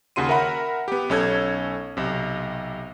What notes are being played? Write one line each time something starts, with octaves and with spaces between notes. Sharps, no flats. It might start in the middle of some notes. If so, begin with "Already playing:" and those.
D#2 C#3 F#4 C6 D#7
A#4 E5 F#5 B5
B3 G4
B1 C#4 A4 G#6
B1 C3